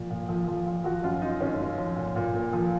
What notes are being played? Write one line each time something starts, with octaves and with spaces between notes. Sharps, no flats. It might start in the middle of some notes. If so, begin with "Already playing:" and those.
Already playing: A#2 F3
A#2
F3
F3
F3
F3 F#4
F#2 F4
F#2 D#4
F#2 C#4
F#2
F3
A#2
A#2
A#2
F3